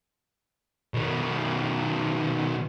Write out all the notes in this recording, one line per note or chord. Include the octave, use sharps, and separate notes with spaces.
B2 D#3